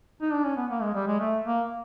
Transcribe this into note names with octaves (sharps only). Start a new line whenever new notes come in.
D#4
D4
C#4
B3
A#3
G#3
G3
G#3
A3
A#3